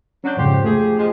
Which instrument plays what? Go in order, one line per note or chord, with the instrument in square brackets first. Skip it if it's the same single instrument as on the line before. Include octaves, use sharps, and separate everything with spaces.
[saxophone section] F#3 D4 [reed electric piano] C#4 G6
[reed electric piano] F2 G#2 C#3 [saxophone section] F4 G4 C5
[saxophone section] F3 G4 G#4 [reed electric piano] A3
[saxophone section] F3 G#3